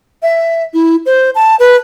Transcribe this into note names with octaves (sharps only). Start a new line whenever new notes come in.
E5
E4
C5
A5
B4